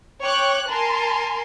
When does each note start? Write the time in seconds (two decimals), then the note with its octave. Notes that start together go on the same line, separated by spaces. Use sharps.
0.22 C#5 G5 C#6 D6 F#6
0.70 A#4 G#5 A5 C6